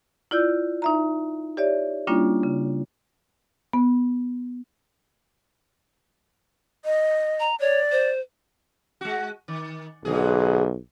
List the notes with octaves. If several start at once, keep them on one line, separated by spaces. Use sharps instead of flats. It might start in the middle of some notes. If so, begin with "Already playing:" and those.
E4 F4 D5 E6 G6
D#4 E5 A#5
G4 C#5 D5 E5
G3 A#3 C#4 D4 E4 F4
C#3
B3
D#5
A#5
C#5 D5
C5
G#3 F#4
D#3
B1 G#2 D3 G#4